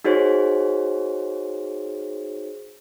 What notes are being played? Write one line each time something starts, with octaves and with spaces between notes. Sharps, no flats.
D#4 F#4 G#4 C5 C#5